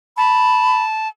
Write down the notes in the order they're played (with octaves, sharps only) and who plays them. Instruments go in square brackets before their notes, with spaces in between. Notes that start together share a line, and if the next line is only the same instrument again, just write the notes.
[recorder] A5 [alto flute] B5